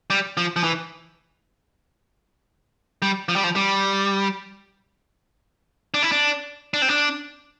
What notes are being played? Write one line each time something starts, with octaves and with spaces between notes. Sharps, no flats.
G3
F3
F3
E3
G3
F3
G3
F3
G3
D4
E4
D4
D4
C4
D4